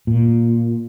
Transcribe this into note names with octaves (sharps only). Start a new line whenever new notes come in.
A#2